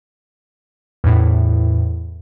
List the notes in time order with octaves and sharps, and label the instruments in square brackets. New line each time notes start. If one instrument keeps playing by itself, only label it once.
[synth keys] E2 A2